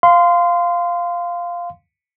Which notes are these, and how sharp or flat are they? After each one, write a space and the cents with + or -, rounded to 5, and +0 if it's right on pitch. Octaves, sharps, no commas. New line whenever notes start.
F5 +0 C6 -20